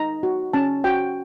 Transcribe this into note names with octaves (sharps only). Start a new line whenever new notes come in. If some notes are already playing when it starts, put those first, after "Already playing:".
Already playing: D#4 A#5
F#4
C#4 A5
F#4 G5